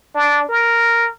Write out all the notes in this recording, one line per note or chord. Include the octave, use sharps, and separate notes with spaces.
D4
A#4